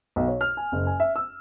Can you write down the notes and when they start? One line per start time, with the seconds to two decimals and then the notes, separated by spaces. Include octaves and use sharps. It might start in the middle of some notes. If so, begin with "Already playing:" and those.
0.16 B1
0.28 C#5
0.41 F6
0.57 G#5
0.72 F#1
0.87 G#5
1.00 E5
1.16 E6